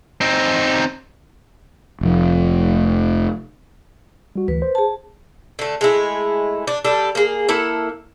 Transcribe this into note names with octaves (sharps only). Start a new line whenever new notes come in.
C4 D#4
F1 F3
G3 F#4
D2 E3 B4
C5
G#4 A5
D3 A3
G#3 A3 E4
D4
G3 D4 A4
A#3 G#4
A#3 E4 A4 F#5